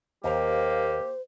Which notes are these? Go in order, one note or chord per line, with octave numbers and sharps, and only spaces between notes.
D#2 A#3 G4 C5 F5